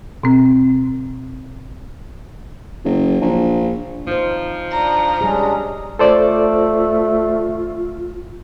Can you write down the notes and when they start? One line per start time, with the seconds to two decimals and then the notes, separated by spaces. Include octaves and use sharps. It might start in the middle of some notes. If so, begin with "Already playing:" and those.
0.23 B2 C4
2.84 F#1
3.21 A#1
4.07 F3 D#4 C5
4.72 D4 A#5
5.21 G3 G#3 C#4 D4 G#4
5.99 A3 F4 A4 C5 D5